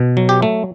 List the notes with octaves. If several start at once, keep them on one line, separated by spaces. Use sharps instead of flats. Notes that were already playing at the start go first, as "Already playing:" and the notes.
Already playing: B2
F#3
G4
A3